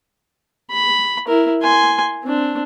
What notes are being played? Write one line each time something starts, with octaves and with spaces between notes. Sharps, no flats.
B5
E4 A#4
G#5 C6
C4 D4